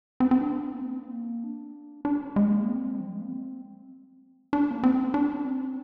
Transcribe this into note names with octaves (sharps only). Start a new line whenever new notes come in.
C4
C4
D4
A#3
C4
A#3
D4
D4
G#3
A#3
C4
F3
G3
G#3
A#3
C4
D4
A#3
C4
D4
C4